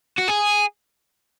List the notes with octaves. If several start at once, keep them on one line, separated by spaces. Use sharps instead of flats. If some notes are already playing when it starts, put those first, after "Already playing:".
F#4
G#4